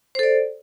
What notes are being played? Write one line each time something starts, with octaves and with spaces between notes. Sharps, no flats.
A4 C5 D5